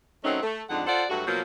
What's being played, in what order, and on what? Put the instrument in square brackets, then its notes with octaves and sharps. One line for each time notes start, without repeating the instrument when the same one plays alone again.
[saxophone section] D#3 F#3 A3 C4 C#4 D#4
A3
F2 D3 G#3 D4 D#4 F#5
F4 A4 C5 D5 F#5
G2 F#3 A3 F#4
B2 F3 F#3 A#3